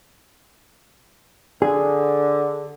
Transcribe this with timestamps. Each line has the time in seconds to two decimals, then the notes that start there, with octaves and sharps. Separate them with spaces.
1.62 D3 G#4